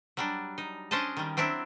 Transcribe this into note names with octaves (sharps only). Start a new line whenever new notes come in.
F#3 G3 D4
D#4
C#4 D4 C5 D#5 A5
D#3 G3
F#3 C4 D4 E4